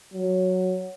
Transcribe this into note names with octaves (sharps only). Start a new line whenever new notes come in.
F#3